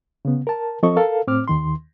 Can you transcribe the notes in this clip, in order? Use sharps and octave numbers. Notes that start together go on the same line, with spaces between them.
C#3 B3
A#4 A5
F3 C4 A4 D#5 C#6
A4 A#4 F5
A2 C4 D6 F6
D#2 D#3 C6